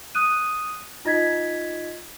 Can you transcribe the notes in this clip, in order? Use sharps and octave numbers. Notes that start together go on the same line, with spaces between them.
D#6 F#6 D#7
D#4 F4 D#5 G#6 B6